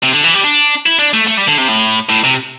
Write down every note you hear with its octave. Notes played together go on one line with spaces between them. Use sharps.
C3
D3
E3
G3
D4
E4
D4
A3
A3
G3
D3
C3
A2
A2
C3